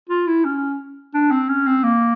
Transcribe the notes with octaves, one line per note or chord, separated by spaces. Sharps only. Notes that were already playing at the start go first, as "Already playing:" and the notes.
F4
E4
C#4
D4
C4
C#4
C4
A#3